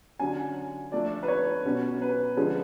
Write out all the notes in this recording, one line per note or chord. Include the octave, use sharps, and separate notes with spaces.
D3 F#3 C#4 G#5
F3 A3 D4 D5
B4
C#5
B2 F#3 C#4
B4
D3 F3 G#3 C#4